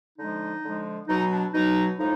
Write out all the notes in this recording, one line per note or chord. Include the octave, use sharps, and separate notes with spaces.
D3 F3 G#3 D#4
D3 F3 G#3
B2 F#3 D#4
D4
B2 F#3 D#4
A2 F3 G#3 D#4